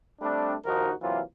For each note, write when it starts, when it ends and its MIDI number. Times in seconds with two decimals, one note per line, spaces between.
0.21 0.54 55
0.21 0.54 57
0.21 0.54 60
0.21 0.54 62
0.65 0.91 34
0.65 0.91 39
0.65 0.91 53
0.65 0.91 63
0.65 0.91 66
0.65 0.91 70
1.02 1.21 48
1.02 1.21 52
1.02 1.21 54
1.02 1.21 58
1.02 1.21 65